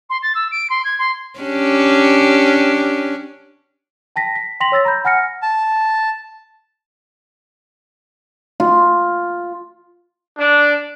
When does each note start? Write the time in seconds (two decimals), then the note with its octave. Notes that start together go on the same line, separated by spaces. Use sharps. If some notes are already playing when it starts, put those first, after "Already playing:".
0.09 C6
0.22 A6
0.34 E6
0.51 D7
0.69 C6
0.84 G#6
0.98 C6
1.39 C#4 D4 G4
4.16 G5 A5 A#6 B6
4.35 B6
4.60 G5 C6 A#6 B6 F7 F#7
4.72 C#5 E6 A6 A#6
4.85 A#5 B5 G6
5.05 F#5 G#5 F6 A#6 C#7
5.42 A5
8.60 F4
10.38 D4